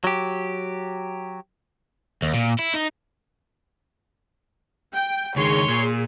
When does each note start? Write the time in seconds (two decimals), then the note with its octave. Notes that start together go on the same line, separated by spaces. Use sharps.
0.04 F#3 G4
2.22 D#2
2.34 A#2
2.59 E4
2.74 D#4
4.95 G5
5.36 C#2 D#3 G#4 C#5 C6
5.69 A#2